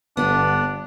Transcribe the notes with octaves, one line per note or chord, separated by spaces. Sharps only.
G1 B3 D4 A4